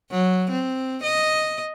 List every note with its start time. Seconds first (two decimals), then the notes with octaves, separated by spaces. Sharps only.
0.11 F#3
0.51 C4
1.03 D#5